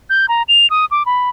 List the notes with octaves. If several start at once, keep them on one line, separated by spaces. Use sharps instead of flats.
G6
A#5
F7
D#6
D6
B5